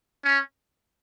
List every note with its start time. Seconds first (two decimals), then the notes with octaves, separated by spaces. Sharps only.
0.25 C#4